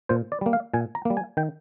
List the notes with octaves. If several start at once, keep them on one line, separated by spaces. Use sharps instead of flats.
A#2 C5
D5
G3 A#3
F5
A#2 G#5
A#5
G3 A#3
G#5
D#3 G5